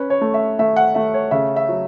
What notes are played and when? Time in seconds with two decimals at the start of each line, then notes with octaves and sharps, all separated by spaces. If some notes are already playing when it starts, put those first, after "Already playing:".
Already playing: C#4 B4
0.10 C#5
0.21 A3
0.34 E5
0.59 A3 E5
0.76 F#5
0.95 A3 E5
1.14 C#5
1.31 C#3 E5
1.56 E5
1.69 F#3